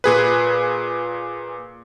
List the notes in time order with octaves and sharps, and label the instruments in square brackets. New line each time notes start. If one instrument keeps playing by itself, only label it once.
[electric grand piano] A#2 G#4 B4